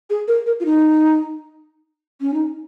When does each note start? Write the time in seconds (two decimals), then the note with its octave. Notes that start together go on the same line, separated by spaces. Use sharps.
0.10 G#4
0.28 A#4
0.46 A#4
0.60 F4
0.65 D#4
2.21 C#4
2.34 D#4